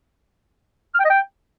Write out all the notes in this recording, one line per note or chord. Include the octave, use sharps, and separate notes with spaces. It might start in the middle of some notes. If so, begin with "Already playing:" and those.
F6
G5
D#5
G5